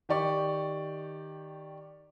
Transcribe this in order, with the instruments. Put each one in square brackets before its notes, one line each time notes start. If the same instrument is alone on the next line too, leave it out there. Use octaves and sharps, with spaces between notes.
[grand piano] D#3 G4 D5 C#6